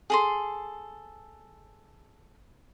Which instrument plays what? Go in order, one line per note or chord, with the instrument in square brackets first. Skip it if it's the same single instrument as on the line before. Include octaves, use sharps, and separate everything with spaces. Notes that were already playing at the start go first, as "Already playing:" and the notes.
[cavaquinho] G#4 A4 C6